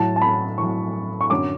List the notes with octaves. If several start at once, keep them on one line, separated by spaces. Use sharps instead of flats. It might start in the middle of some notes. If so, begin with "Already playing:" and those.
Already playing: A2 F#3 A5
A5
B5
A2 F#3 C#6
C#6
F#2 D3 F#3 D6